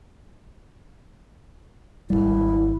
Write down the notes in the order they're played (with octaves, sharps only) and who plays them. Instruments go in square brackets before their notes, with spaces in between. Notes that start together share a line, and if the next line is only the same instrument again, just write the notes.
[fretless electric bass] G#1 D#2 G3 [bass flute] E4